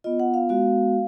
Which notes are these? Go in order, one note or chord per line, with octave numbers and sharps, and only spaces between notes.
B3 F4 D#5
F#5
F5
G#3 B3 F#4 F5